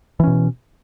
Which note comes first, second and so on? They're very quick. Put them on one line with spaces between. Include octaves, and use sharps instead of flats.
E3 C#4 B2